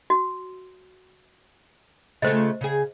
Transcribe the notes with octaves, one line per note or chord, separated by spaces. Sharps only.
F#4
C#3 A3 F4 C5 D#5
C#3 G#4